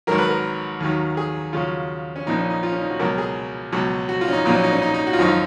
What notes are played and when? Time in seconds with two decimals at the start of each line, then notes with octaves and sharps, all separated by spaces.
0.07 G#1 G#2 F#3 A#4
0.18 B4
0.29 A#4
0.80 D#2 D#3 F#3
1.17 G#4
1.53 D#2 C#3 F#3 F4
2.16 C#4
2.26 A#1 A#2 F3 D#4
2.39 C#4
2.50 D#4
2.63 F4
2.72 C#4
2.81 D#4
2.90 F#4
2.99 C#2 B2 F#3 A#4
3.18 G#4
3.72 C#2 B2 F#3
4.09 F#4
4.21 F4
4.28 C#4
4.33 D#4
4.45 A#1 A#2 F#3 D#4
4.55 C#4
4.64 D#4
4.73 C#4
4.82 D#4
4.94 D#4
5.07 F#4
5.13 F4
5.19 G#1 F#2 F3 D#4
5.28 F4